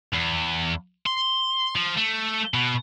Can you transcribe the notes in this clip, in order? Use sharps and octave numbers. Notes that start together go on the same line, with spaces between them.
E2
C6
F3
A3
B2